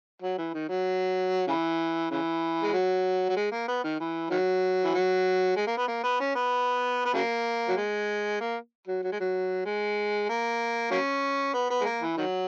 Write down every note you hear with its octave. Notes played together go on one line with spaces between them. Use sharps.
F#3
E3
D#3
F#3
C#3 E3
C#3 E3
G#3
F#3
F#3
G#3
A#3
B3
D#3
E3
D#3 F#3
E3
F#3
G#3
A#3
B3
A#3
B3
C#4
B3
B3
C#3 F#3 A#3
F#3
G#3
A#3
F#3
F#3
G#3
F#3
G#3
A#3
F#3 A#3 C#4
B3
B3
G#3
A#3
E3
D#3 F#3